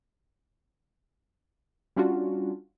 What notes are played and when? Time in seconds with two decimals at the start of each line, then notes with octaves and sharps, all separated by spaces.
1.96 G3 C#4 D4 F4 F#4